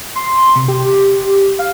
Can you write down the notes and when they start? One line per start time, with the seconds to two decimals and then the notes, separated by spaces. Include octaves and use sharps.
0.16 C6
0.56 C3
0.68 G4
1.59 F5